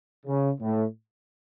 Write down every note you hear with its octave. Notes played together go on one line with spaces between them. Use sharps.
C#3
A2